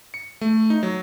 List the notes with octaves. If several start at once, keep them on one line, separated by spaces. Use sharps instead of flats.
C#7
A3
D#4
F#3